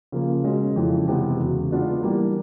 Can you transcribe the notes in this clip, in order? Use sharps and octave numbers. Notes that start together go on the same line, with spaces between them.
C#3 F3 A#3
B2 G#3 C#4
F2 C#3 E3 G#3
C3 E3 G#3 B3
E2 C#3 F#3
G#3 B3 D4 F4
E3 G3 A#3